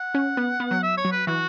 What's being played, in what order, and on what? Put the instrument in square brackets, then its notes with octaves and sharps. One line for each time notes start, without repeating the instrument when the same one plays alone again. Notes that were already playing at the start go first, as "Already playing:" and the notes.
Already playing: [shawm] F#5
[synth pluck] C#4
B3
B3
F#3
[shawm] E5
C#5
[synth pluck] F#3
[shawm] B4
[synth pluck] E3 [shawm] F#4